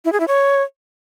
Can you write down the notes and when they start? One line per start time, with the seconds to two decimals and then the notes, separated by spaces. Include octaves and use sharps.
0.05 E4
0.13 G#4
0.20 E4
0.28 C#5